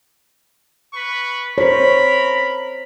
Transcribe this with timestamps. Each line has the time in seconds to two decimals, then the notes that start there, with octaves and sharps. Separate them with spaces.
0.93 B4 B5 C#6
1.58 A#4 C5 C#5 B5